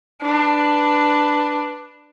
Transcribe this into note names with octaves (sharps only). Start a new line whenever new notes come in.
D4 B4